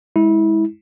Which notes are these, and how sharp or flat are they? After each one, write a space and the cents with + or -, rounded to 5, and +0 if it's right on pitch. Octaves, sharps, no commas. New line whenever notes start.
G#3 +0 E4 -25